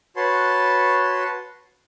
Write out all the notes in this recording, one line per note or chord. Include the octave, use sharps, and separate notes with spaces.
F#4 B4 C#5 A5 C6